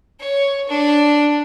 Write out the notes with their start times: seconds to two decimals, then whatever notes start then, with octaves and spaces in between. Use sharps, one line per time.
0.20 C#5
0.68 D4